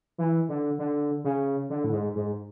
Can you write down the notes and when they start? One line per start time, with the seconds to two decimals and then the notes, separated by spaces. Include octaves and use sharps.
0.18 E3
0.49 D3
0.79 D3
1.24 C#3
1.70 D3
1.84 A2
1.92 G#2
2.15 G#2